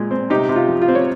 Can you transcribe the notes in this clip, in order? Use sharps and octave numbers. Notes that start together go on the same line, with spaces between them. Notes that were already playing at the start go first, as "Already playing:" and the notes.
Already playing: A#2 G#3
C4
C3 D#4 G4
C3
F4
F3
F4
C4
C#5